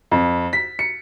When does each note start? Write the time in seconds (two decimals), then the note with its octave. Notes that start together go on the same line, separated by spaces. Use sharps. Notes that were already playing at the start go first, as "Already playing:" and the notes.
0.11 F2
0.53 B6
0.79 C#7